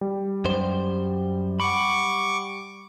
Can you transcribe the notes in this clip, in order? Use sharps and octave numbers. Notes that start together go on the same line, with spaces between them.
G3
F#2 C5
F#5 B5 C#6 D6